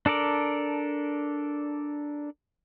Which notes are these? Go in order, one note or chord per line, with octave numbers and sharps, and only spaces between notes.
D4 A4 A#4 D5